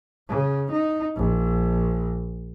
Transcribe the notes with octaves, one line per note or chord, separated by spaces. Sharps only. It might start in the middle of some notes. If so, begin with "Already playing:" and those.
C#3
D#4
A#1